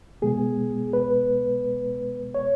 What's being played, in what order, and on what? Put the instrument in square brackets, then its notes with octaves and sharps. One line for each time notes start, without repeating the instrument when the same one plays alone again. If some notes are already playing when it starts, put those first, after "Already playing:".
[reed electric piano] B2 G#3 B3 G#4
B4
C#5